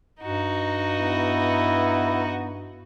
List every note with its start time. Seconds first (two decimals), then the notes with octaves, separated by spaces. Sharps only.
0.21 G2 D#4 F#4
1.00 B3 E4